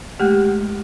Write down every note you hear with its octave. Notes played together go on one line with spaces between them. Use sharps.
G#3 A3 G4 F#5